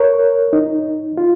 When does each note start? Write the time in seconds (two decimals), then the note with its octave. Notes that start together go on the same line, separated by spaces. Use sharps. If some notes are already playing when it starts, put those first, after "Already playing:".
Already playing: A#4 C#5
0.53 D#4
1.18 F4